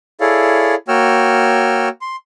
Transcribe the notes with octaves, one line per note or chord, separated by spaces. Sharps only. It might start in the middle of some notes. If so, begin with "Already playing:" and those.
E4 G#4 A4 C#5 D5 F5
A#3 F#4 C#5 G5 E6 F6
C6